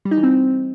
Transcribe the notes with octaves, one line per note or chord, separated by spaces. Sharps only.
G3
D#4
E3
C4